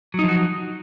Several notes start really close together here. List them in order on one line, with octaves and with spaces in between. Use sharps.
F#3 D#4 F3 F#4